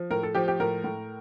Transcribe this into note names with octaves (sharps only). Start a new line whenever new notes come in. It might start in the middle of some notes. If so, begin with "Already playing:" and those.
Already playing: F3
A2 A#4
A4
F3 G4
G4
A2 A#4
A2